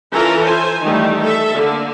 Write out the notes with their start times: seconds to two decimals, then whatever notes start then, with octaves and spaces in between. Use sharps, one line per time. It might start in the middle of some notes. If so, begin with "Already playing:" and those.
0.12 E3 C#4 F4 A4 A#4 A#5
0.44 C5 G#5
0.82 D#3 E3 G3 A3
1.22 A4 E5
1.53 D3 A#3